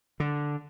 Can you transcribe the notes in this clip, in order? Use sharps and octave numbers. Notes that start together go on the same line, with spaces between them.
D3